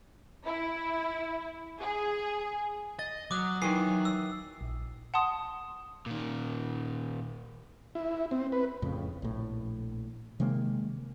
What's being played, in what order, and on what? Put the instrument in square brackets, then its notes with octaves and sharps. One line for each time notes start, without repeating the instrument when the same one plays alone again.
[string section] E4
G#4
[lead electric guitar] D#5 [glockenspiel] A6
[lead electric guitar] F#3 [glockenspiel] D6 D#6 F#6
[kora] D#3 E3 [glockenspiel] C7
[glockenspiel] E6
[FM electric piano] A#1
[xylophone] F#5 A5 C6 D#6
[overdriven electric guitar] A#2 D#3
[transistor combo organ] E4
C4
B4
[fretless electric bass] F2 A2 C#3
A#1 A2
C3 D#3 G#3 A#3